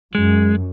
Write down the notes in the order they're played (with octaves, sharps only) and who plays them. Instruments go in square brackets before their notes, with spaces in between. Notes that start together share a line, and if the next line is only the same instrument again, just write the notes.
[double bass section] F#2 [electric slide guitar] G#3